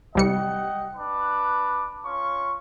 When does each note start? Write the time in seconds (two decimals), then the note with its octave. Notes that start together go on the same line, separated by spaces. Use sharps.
0.15 C2 G3 D#5 F#5 G5 C#7
0.96 D4 B4 D6
2.05 C#4 F4 C#6